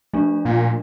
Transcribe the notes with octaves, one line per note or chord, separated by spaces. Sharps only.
F3 A3 D4
A#2